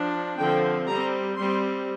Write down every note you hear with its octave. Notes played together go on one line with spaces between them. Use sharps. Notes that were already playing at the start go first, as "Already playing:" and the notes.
Already playing: F3 D4
D3 F3 C4 G5
G3 C4 A#5
G3 C4 C6